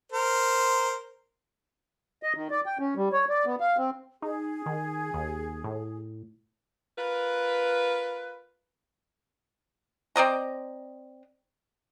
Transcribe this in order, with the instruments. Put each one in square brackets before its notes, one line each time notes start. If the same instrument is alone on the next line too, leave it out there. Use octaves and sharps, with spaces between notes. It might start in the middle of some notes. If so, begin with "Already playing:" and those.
[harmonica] A#4 C5
[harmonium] D#5
D#3
D5
G5
C#4
G3
C#5
D5
B3
F5
C4
[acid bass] D#4 [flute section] G#4
[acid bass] D#3
D#2
A2
[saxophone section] F4 A#4 B4
[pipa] C4 D5 D#5 A#5